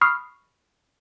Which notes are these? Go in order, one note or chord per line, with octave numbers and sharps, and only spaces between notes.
B5 C#6 D#6 F6 C7